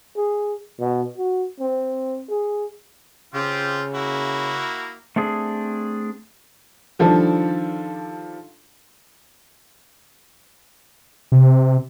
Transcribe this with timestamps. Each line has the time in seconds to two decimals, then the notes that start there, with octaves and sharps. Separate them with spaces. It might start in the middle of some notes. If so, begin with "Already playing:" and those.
0.16 G#4
0.79 B2
1.17 F#4
1.60 C4
2.29 G#4
3.34 C#3 C4 F4 G4
3.94 A#3 E4 F#4
5.16 A3 C4 D4 G#4
6.99 D3 D#3 F3 G3 D4 A4
11.32 C3